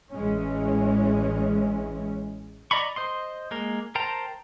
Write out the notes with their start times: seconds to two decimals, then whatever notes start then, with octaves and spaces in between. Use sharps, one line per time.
0.13 A1 E3 G#3 C#4
2.71 D5 D#5 A#5 B5 C#6
2.96 C5 D#5 C6
3.51 G#3 A#3 A#4
3.95 A#4 C5 G5 A5 A#5